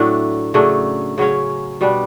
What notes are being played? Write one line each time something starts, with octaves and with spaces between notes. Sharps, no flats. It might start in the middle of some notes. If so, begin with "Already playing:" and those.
Already playing: A2 F#3 A3 D4
C#3 F#3 A3 D4
C#3 F#3 C#4
B2 G3 D4